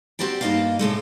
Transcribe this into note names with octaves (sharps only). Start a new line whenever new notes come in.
C4 F#4 G4 D5 G5
G2 A#3 D#4 G4 D#5 F5
A2 C3 G#3 A3